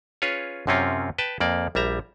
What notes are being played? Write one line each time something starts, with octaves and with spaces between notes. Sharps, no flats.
C#4 F4 G#4 B4 C#5
F#2 C3 C4 C#4 F4
B4 G5 A5
F2 A#3 D5
A#1 G3 E5 A#5